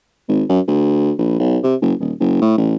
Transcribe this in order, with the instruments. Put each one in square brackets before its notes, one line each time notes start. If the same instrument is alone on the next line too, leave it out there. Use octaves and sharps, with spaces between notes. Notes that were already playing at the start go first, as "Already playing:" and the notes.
[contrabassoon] G#1
F#2
D2
A#1
B1
C3
F#1
D#1
F#1
A2
A1